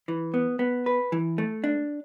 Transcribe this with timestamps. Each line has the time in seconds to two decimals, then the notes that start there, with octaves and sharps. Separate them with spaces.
0.08 E3
0.34 B3
0.59 B3
0.86 B4
1.12 E3
1.38 A3
1.64 D4